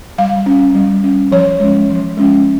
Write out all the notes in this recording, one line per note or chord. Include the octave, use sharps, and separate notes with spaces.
G3 F5
C#4
G3
C#4
F3 C#5
G#3 C#4
F3
G#3 C#4